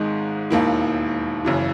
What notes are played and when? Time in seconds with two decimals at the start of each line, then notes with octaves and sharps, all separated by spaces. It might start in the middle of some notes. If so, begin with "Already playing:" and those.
Already playing: G#1 G#2 D#3 G#3
0.50 E1 D#2 D#3 A#3 E4
1.45 F#1 F#2 C#3 E3